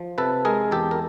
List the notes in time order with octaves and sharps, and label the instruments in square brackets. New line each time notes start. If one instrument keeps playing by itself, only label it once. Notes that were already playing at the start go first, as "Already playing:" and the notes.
Already playing: [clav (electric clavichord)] F3
C3 A4 B4
G#3 G#4 A#4
E2 G4 A4
A#4